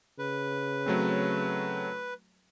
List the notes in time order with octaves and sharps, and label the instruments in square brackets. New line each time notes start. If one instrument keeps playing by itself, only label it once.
[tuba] C#3 [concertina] B4
[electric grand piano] F#3 A3 C4